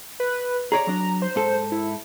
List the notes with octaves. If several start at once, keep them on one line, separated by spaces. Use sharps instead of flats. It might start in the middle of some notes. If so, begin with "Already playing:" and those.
B4
G#4 C#5 D5 A#5
F#3 D4
C5
G#2 A4
E4